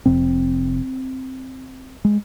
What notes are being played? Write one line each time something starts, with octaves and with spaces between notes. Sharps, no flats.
F1 F2 C3 C4
G#3